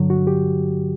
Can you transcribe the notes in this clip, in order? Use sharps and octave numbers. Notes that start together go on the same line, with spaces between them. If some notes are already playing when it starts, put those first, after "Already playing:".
Already playing: G2 D3 F#3
F#4
G4